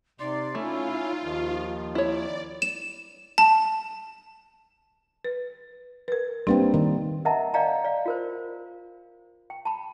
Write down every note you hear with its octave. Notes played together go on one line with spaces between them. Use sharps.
C3 D#4 D5 C6
A3 C#4 E4 F4
D#2 D#3 F3
E4 C#5 D5
E7
A5
B4
A#4 B4
G3 A#3 C4 D4 B4
D#3
A#4 D#5 E5 F#5 A5 A#5
D5 D#5 F5 G5 A#5
D5 F5
F4 A#4 C5
G5
A5 B5